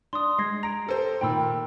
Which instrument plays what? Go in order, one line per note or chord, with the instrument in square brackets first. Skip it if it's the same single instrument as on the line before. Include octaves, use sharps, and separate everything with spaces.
[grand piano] D4 [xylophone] C6 D#6
[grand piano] G#3 [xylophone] G#6 A#6 C7
[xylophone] A#5 D7 [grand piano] A#6
[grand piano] G4 A4 C5
[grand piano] A#2 D#3 [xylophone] G5 B5 E6